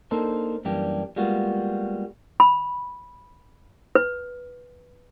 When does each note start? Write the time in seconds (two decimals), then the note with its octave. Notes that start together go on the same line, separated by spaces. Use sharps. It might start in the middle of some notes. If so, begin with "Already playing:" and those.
0.11 A#3 D4 D#4 A4 A#4 C5
0.65 F#2 E3 G3 A#3 D4 G4
1.16 G3 G#3 A#3 B3 F4 F#4
2.40 B5
3.95 B4